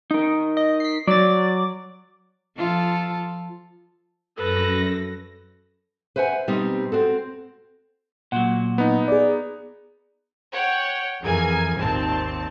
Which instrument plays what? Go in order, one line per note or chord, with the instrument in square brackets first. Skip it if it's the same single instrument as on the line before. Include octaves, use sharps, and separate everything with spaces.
[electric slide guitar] D#4 A#4
[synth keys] D#5
B6 C7
[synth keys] F#3 A6 [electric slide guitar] D5
[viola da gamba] F3 F4 A4
[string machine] F#2 A#6 [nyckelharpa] A4 B4
[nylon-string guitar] B4 C5 E5 F#5 G#5
B2 G3 C4 D#4 G4
C4 F#4 A4
[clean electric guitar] A#2 F#3 [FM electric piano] F#5
[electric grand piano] B3 D#4
[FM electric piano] G#4 D5
[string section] C#5 F#5 G5
F2 E3 G#4 A#4 G#5 G#6
G#1 D#2 A#2 C4 A5